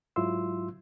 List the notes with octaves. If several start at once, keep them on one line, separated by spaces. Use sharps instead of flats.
G#2 F#3 E4 F4 C6 E6